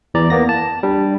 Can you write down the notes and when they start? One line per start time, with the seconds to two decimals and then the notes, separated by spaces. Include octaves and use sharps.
0.14 E2 E3 D5 A#5
0.30 A#3 B3 A#6
0.49 A5
0.83 G3 D4